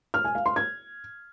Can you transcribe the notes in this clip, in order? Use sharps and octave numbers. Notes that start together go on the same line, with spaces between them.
F6
G#5
F5
C6
G#6